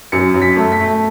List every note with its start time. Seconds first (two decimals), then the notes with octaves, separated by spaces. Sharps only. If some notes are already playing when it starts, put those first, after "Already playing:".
0.12 F#2 C#7
0.34 F#2
0.42 B6
0.57 A3
0.72 B6
0.80 A3